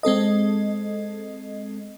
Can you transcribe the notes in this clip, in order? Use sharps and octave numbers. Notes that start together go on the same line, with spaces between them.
G#3 C4 A4 D#5